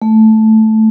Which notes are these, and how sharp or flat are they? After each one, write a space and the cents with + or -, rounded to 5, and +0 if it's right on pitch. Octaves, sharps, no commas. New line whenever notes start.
A3 -5